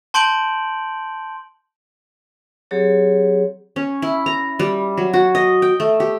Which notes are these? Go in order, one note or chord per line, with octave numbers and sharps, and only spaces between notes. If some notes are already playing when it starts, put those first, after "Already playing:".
A5 C6 G6 D7 F#7
F#3 C4 G4 G#4 C#5
C#4
E4
A#5
G3
F#3
F#4
D#5
G5
A3
G4